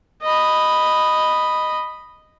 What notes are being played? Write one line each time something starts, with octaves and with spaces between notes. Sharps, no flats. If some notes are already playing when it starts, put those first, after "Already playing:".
D#5 B5